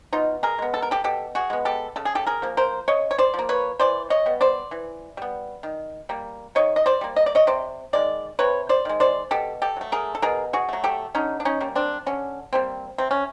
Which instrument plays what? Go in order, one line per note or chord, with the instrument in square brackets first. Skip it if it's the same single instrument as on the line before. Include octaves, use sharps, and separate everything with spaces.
[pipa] B2 D#4 F4
G#4 A#4
G#3 B3
A4
A#4
G4 A4
B2 G4 A4
F#4 G#4
G#3 B3
G4 A4
C#3 A4
G#4
G4 A4
G#4 A#4
F3 A#3
A#4 C5
C#3 C#5 D#5
C#5
C5 D5
F3 A#3
B4 C#5
E3 C5 D5
C#5 D#5
G3 B3
C5 D5
E3
G3 B3
D#3
G3 A#3
D#3 C#5 D#5
D#5
C5 D5
G3 A#3
D#5
D5
C#5 D#5
C3 C5 D5
D#3 G#3 D5
C3 B4 C#5
C5 D5
D#3 G#3
C5 D5
B2 G4 A4
G4 A4
F#3 A3
G#4 A#4
A4
B2 G#4 A#4
F#4 G#4
F#3 A3
G4 A4
D3 C#4 D#4
D4
C#4 D#4
G3 A#3
C4 D4
D3 C#4
G3 A#3 C4
C3 C4
C#4